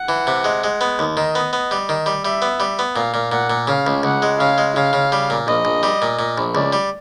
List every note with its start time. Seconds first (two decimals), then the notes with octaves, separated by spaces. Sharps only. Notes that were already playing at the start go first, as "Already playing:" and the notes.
Already playing: F#5
0.09 E3
0.27 C3
0.44 G#3
0.64 G#3
0.81 B3
0.99 D#2
1.17 D#3 D#5
1.35 B3
1.53 B3
1.71 G3
1.89 D#3
2.06 G3
2.25 G3 E5
2.42 B3
2.60 G3
2.79 B3
2.96 A#2 F5
3.14 A#2
3.32 A#2 F#5
3.50 A#2
3.67 C#3 F5
3.87 C#2
4.03 C#2 F#5
4.22 G#3
4.39 C#3 F5
4.58 G#3
4.75 C#3 F5
4.93 C#3
5.12 G3
5.30 A#2
5.47 A#1 D#5
5.65 A#1
5.83 G3
6.02 A#2
6.19 A#2
6.38 A#1
6.55 C#2 D5
6.73 G3